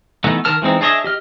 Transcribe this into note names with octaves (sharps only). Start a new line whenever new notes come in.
E3 A3 B3 D#4
D#3 A#4 A5 F6
E3 G#3 C4 D#4
D4 G#4 C#5 D#5 E5
G4 D#5 F6